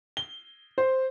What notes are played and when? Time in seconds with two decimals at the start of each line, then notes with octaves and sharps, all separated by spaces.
0.17 G7
0.78 C5